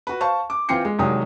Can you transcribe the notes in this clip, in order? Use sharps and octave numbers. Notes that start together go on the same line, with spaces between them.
F#4 B4
C5 F5 A5 C#6
D6
E3 C4 F4 G5 C7 C#7
G#3
C2 D#3 F#3 G#3 G5 D#6